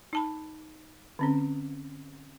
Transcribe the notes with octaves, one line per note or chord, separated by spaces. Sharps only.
D#4 A5 B5
D3 C4 C#4